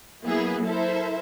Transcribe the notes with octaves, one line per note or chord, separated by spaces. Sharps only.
F#3 A#3 B3 E4 G#4
E4 A4 A#4 C5 E5